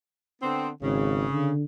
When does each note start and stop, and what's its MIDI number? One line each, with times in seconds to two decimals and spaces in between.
0.42 0.68 50
0.42 0.68 59
0.42 0.68 60
0.82 1.25 32
0.82 1.51 49
1.32 1.64 50